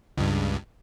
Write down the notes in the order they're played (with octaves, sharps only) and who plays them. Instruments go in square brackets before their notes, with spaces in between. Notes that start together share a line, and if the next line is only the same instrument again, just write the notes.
[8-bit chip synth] C#2 G2